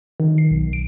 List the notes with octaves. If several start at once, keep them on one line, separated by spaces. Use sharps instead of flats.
D#3
C7
B1
D7